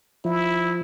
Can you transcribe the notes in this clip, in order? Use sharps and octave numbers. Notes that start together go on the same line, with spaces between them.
F3 E4